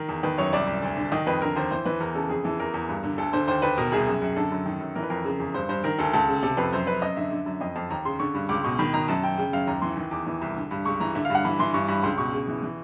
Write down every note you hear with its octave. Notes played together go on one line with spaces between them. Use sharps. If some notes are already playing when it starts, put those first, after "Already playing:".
Already playing: D#3 A#4
E2
D#3 B4
F#2 C#5
C2 D5
C2
D2
D3
D#3 D#5
F2 B4
D3 A#4
D#2 C5
E3 C5
E3 B4
E2 A#4
C#3 A4
F2 G#4
E3 A4
E2 A#4
E2
G2
D3
D2 A4
D3 C5
D#2 C5
D#2 B4
B2 A#4
C2 G#4
F#2
F#2
D3 A4
F#2
D#3
F#2
E3 A#4
B4
F2 A#4
C#3
E2
G2 C5
G2 C5
D#3 A#4
D2 A4
C#2 A4
C#3
C3 A4
F2 B4
F#2 C5
F#2 B4
F#2 D#5
D3 E5
D3
F#2
F2 D#5
F2 A5
D#2 A#5
C#3 C6
D3 C#6
G2
C#2 D6
B2 C#6
D#3 B5
D#3 A#5
F#2 A5
F#2 G5
C#3 G5
F#2 F5
D#2 A#5
E3 C6
D#3
E2 D6
E3
C2
D3
G2
C#2 C#6
E3 A#5
D3 E5
F5
G2 F#5
E3 B5
E3 C6
G2 C#6
G2 B5
C#2 C6
B2 C#6
C#3
E3
E3